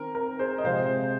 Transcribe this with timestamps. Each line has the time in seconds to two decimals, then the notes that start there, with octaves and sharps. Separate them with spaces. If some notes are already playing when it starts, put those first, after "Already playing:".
Already playing: D#3 C4 A#4
0.15 A#4
0.39 G#4 C5
0.58 D#5
0.64 C3 F3 G#3 C4 C5 F5